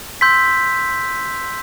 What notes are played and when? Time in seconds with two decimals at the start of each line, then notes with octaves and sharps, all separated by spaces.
0.21 C6 E6 G6 B6